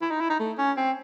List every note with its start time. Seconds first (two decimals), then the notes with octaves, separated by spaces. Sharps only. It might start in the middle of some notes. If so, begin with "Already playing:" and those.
0.02 E4
0.11 D#4
0.20 E4
0.30 D#4
0.39 A3
0.58 C#4
0.77 C4